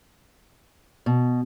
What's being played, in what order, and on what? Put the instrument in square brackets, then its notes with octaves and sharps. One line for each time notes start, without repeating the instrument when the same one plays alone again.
[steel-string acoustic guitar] B2